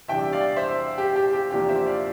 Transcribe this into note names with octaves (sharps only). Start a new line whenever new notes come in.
E2 C3 G3 D4 E5 G5
D5 F5
C5 E5
G4
G4
G4
E2 C3 F3 A#3 D4 G4
C5 E5
D5 F5